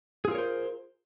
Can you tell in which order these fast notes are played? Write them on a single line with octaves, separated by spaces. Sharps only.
G#4 F4 A#4 C#5 C5